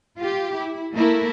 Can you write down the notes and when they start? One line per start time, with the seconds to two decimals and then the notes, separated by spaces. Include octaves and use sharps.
0.18 F4 G4
0.54 E4
0.93 A3 A#3 E4 A#4